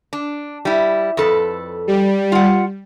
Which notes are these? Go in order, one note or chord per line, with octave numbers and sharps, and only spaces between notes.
D4
G3 E4
F2 A4 B4
G3
F4 F#5